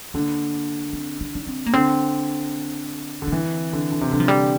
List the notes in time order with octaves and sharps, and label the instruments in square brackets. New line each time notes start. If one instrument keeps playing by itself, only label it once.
[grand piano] D3 [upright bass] A#3
[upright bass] C4
D4
D4
C4
A#3
[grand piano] D3 [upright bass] C4
[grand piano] D3
[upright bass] D4
[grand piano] E3 [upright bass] C4
[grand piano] D3
D3
C3
[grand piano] D3 [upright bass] G3
[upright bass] F3
G3